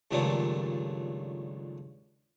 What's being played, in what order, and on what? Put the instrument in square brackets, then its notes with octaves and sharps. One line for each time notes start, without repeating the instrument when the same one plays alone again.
[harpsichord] C#2 G2 A#2 D#3 F#3 A3